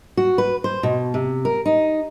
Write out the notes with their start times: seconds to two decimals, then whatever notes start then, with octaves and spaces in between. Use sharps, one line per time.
0.17 F#4
0.38 B4
0.64 C5
0.83 B2
1.14 C3
1.45 A#4
1.65 D#4